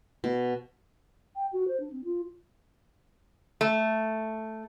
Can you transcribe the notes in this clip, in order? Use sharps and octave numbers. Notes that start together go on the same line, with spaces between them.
B2
G5
F#4
C5
D4
C4
F4
A3